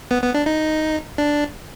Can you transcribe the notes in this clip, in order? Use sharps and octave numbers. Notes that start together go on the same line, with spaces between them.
B3
B3
D4
D#4
D4